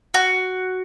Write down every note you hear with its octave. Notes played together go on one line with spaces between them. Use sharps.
F#4